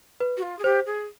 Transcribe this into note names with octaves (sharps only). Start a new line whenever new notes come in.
B4
F#4
F4
G#4
G4 C5
G#4